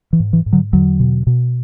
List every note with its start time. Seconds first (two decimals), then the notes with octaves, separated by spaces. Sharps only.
0.13 E3
0.20 G#2
0.33 E3
0.46 G#2
0.53 D3 F#3
0.73 E2 D3 F#3
1.00 B2
1.27 B2